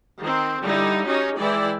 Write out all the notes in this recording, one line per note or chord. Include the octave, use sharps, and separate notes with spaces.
D#3 C4
D3 G3 D#4 E4
C#4 D#4 F#4 G4
E3 G#3 E4 D5 G5